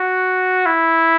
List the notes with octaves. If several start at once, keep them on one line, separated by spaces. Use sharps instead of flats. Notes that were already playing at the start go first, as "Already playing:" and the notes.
Already playing: F#4
E4